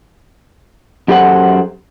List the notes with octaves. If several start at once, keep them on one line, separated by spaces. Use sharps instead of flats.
F#2 G4 A4 C5 F#5